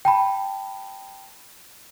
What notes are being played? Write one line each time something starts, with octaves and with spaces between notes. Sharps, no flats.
G5 A5 B5